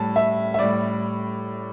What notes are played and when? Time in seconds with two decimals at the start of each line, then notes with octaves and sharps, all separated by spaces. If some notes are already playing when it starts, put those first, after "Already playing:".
Already playing: A2 G3 A5
0.16 E5
0.54 E5
0.58 A2 G3 D5